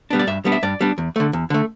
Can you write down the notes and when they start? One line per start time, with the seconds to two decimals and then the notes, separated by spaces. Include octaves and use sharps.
0.10 G3 B3 D4
0.19 D5
0.27 G2 E5
0.45 G3 B3 D4
0.52 E5
0.63 G2 D5
0.81 G3 B3 D4
0.98 E2
1.16 D3 A3
1.33 E2
1.50 D3 A3